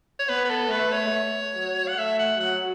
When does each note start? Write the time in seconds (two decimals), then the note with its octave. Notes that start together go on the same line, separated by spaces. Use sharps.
0.19 C#5
0.29 B3 B4
0.45 B4
0.50 A4
0.71 A3 B4
0.92 C#5
1.56 F#3
1.88 F#5
1.98 A3 E5
2.19 F#5
2.40 F#3 F#5